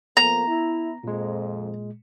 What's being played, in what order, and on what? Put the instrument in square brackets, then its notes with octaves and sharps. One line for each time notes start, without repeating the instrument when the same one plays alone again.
[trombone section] F2 A#3 [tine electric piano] B3 [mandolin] A#5
[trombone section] E4
[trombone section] F2 [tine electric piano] A#2 G#3